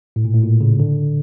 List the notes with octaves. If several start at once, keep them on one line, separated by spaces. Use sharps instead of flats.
A2
A#2
A2
A#2
C#3
D3